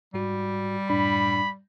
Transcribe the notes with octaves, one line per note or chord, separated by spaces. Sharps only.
G#2 G3 F#4
F#2 A2 D4 B5